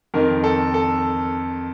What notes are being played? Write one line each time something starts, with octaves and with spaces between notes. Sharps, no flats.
F2 D#3 A#4
A4
A4